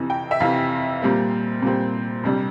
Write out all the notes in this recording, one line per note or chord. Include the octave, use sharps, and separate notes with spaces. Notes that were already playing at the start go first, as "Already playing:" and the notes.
Already playing: F2 C3 E3
G5
E5
F2 C3 E3 F5
A#2 G3 C4
A#2 G3 C4
F2 C3 G3 D4